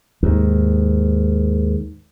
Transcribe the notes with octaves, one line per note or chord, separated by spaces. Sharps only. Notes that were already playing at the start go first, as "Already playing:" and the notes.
D#2 G#2